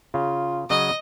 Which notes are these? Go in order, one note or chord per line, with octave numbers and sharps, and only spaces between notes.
C#3 F4
C#3 F#3 D#5